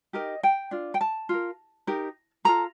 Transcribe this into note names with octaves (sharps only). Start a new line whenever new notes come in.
D#4 G4 A#4 D#5
G5
D4 F4
G5
A5
F4 A#4
D#4 G4 A#4
F4 A4 A#5